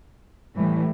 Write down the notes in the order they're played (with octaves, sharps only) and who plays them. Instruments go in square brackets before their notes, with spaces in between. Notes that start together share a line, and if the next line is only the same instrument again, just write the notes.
[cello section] A2 E3 G3